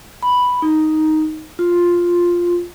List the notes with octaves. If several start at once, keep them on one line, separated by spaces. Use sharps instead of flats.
B5
D#4
F4